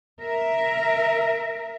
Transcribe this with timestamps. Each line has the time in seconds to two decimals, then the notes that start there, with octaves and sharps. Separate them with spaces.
0.21 A#4 E5